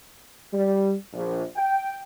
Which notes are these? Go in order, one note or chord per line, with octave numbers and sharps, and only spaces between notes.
G3
A#1
G5